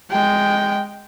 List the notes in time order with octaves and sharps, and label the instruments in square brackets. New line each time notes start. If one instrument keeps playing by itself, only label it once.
[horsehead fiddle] G#3 G5